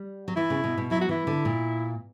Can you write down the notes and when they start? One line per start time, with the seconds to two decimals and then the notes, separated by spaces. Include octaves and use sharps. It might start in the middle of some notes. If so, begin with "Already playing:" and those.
Already playing: G3
0.28 F#3
0.36 E3 E4
0.50 C#3
0.64 B2
0.78 B2
0.91 F#3 E4
1.01 F#4
1.09 E3 E4
1.27 D3
1.45 A#2